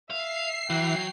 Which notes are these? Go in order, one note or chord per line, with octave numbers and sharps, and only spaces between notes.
E5 F5 C7
E3 F#3 F#4 G5